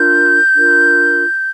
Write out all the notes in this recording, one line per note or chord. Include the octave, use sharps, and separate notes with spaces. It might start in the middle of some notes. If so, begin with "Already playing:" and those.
Already playing: D4 F4 A#4 G6
D4 F4 A#4